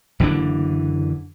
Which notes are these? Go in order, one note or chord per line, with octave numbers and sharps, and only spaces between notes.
F#1 D3 E3 D4